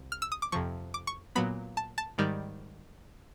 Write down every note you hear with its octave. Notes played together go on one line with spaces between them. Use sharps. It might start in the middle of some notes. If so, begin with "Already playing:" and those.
Already playing: C2
F6
E6
D#6
D6
F2 C3 F3 C#6
D6
C#6
A#2 F#3 B3 B5
A5
A5
G#2 D#3 G3